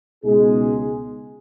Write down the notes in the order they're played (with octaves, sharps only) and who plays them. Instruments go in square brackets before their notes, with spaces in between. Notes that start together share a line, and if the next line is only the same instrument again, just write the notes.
[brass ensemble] C#2 B2 G#3 D#4 G#4